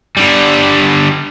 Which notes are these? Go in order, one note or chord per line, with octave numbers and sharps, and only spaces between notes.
D3 G3